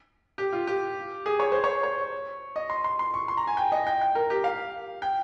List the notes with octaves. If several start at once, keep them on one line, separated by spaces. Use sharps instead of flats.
G4
F4
G4
G#4
C#5
C5
C#5
C#5
D#5
C6
C6
C6
C#6
C6
A#5
G#5
G5
D#5
G5
G5
A#4
G4
F5
G5